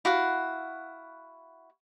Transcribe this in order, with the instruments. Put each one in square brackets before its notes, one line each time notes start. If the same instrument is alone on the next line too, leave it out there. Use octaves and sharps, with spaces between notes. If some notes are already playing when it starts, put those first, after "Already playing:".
[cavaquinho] E4 F#4 F5 F#5